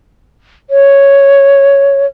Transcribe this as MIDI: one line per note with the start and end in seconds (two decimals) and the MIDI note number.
0.70 2.06 73